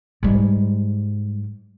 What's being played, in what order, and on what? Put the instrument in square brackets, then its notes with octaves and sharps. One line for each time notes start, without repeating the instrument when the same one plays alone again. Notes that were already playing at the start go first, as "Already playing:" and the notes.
[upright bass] G#2 G3